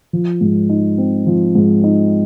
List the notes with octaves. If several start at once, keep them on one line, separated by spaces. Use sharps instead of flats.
F3
G#2
D#4
C4
F3
G#2
D#4